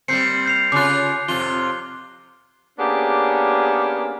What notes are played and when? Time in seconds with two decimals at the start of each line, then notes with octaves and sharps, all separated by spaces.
0.08 G3 A#3 C4 G6 C7 C#7
0.46 G6 C7 F7
0.72 C#3 F4 D6 F#6
1.28 F2 C3 F4 G7
2.79 A#3 B3 C#4 D4 G4 G#4